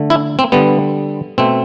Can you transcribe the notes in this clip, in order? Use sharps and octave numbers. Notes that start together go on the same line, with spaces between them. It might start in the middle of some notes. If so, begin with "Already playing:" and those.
Already playing: D3 A3
E4
C4
D3 G3 B3
B2 A3 C4